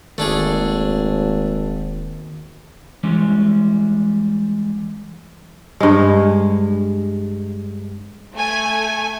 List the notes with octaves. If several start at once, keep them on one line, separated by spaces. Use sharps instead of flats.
D#1 G#1 D#2 A3 D4 G#4
E3 G3 G#3 C#4
G2 G#3
A3 G#5